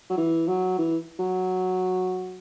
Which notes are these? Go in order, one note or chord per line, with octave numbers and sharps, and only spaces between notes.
F#3
E3
F#3
E3
F#3